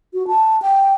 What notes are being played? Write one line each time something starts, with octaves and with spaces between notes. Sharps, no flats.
F#4
A5
G5